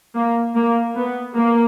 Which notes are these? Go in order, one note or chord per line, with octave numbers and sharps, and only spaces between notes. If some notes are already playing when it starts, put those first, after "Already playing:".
A#3
A#3
B3
A#3